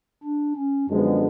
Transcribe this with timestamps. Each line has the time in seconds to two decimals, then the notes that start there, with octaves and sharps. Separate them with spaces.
0.23 D4
0.57 C#4
0.89 F#2 D3 F3 G#3 B3 D4